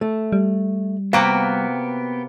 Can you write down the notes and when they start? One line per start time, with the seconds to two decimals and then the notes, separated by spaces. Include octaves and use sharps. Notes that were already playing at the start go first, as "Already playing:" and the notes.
0.01 A3
0.32 G3
1.13 C3 A#3 B3 F#4 F5 G5